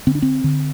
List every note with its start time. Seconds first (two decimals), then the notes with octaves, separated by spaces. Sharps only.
0.07 D3 C4
0.15 D4
0.22 C4
0.44 D3